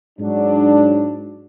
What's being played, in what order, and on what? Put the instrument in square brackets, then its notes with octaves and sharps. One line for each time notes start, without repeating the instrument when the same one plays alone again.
[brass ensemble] G#2 F#3 D4